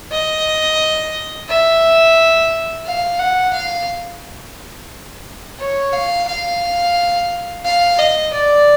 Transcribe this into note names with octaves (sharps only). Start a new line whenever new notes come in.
D#5
E5
F5
F#5
F5
C#5
F5
F5
F5
D#5
D5